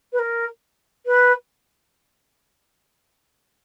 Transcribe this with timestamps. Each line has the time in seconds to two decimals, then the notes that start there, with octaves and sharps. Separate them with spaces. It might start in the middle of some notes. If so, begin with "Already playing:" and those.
0.13 B4
0.19 A#4
1.06 B4